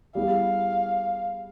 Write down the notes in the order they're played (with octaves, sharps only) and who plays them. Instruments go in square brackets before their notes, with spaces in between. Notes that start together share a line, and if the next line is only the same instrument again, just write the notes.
[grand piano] G3 B3 E4 G#4 [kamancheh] F5